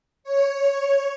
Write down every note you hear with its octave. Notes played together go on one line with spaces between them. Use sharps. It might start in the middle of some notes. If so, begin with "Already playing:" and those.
C#5